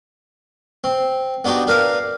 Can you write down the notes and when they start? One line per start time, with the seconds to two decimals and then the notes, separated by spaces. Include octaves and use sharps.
0.84 C4
1.45 B3 D4 D#4 F#4 G4
1.67 D4 A#4 B4 F5